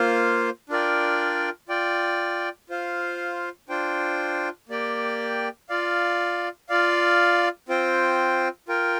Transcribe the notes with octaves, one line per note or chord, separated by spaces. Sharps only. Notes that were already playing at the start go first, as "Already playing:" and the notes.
Already playing: A#3 F4 C5 F5
D4 F4 A#4 D5 G5
F4 D5 G5
F4 C5 F5
D4 F4 C5 G5
A#3 G4 D5 G5
F4 D5 F5
F4 D5 F5
C4 F4 C5 G5
F4 A#4 G5